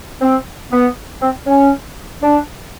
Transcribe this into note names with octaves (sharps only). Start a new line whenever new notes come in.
C4
B3
C4
C#4
D4